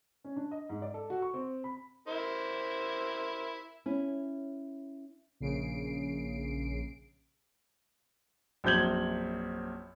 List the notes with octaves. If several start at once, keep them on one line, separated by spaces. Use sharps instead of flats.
C#4
D4
D#5
G#2
D5
A4
F#4
C#6
C4
B5
E4 A#4 C5
C#4 E4
A#1 C#3 C7 D7
A#1 F#2 C4 G6 G#6 F#7